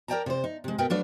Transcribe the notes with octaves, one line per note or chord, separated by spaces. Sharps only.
A#4 D5 D#5 G5 A5 A#5
C3 C5
D#4
C3 G#3
B2 B3 A#4 B4 G5
F#3 A3 D4 A4 B4 F5